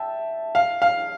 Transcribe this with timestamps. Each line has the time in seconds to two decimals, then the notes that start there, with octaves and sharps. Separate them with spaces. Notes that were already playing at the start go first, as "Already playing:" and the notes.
Already playing: E5 G5 A5
0.55 F5
0.82 F5